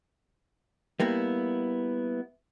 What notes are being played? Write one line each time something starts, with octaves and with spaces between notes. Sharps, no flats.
G3 A#3 B3 E4